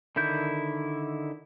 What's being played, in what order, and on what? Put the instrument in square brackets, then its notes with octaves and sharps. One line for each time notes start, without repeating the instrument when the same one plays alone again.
[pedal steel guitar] D3 D#3 E4 G6